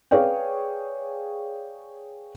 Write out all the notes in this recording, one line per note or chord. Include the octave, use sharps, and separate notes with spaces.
G#4 B4 C#5 D5 F5 G5